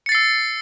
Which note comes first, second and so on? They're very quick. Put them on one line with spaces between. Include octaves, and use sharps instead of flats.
C#7 A6 C7 E6